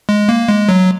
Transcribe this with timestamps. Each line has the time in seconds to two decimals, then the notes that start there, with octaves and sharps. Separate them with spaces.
0.09 G#3
0.29 A#3
0.49 G#3
0.69 F#3